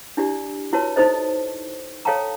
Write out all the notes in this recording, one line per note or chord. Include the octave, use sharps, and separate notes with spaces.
D4 E4 G4 D5
E4 F#4 B4 C#5 A5
D#4 E4 A4 C5 D#5
A4 C#5 F5 G5 A5 A#5